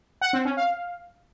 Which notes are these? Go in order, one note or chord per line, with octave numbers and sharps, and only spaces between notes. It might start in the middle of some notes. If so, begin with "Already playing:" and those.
F#5
C4
C#4
F5